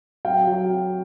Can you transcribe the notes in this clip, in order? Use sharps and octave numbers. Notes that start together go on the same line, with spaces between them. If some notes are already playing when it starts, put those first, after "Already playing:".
F#3 F5 G5
F#3